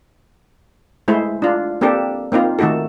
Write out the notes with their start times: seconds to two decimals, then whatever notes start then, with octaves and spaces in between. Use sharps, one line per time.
1.08 G#3 A3 E4 C5
1.42 D4 F4
1.81 A#3 C4 D4 G4 A4
2.32 A#3 C4 D#4 F4
2.59 D#3 A3 D#4 F#4 A4